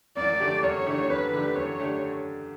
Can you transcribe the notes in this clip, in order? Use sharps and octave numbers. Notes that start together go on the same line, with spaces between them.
F#2 D5
D3 A3 D4 G4
F#2 C#5
D3 A3 D4 G4
F#2 B4
D3 A3 D4 G4
F#2 C#5
D3 A3 D4 G4